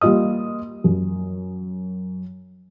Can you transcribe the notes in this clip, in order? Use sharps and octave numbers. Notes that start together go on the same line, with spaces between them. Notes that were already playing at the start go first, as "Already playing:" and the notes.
G3 A#3 F4 D#5 D#6
F#2